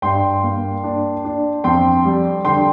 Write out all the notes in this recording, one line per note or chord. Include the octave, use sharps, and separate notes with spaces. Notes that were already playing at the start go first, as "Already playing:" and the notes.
G2 G5 C6
A#3
D4
D4
F2 G5 C6
G3
D3 G5 C6